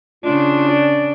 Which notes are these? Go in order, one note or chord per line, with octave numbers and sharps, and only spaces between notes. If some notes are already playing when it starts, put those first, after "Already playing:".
C#3 D4 F4
D5